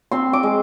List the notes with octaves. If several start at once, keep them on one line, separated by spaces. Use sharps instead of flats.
C4 C6
D6
G#3